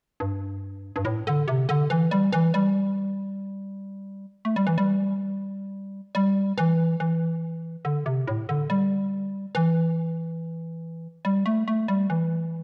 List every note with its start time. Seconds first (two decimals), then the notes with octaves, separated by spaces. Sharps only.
0.20 G2
0.96 G2
1.05 A2
1.27 D3
1.48 C3
1.69 D3
1.90 E3
2.11 G3
2.33 E3
2.54 G3
4.45 A3
4.56 G3
4.67 E3
4.78 G3
6.15 G3
6.58 E3
7.00 E3
7.85 D3
8.06 C3
8.27 A2
8.49 D3
8.70 G3
9.55 E3
11.25 G3
11.46 A3
11.68 A3
11.88 G3
12.10 E3